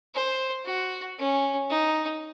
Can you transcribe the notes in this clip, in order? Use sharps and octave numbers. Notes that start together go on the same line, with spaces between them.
C5
F#4
C#4
D#4